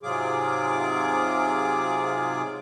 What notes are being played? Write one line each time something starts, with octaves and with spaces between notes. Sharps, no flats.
G#2 C3 F#3 F4 G#4 D6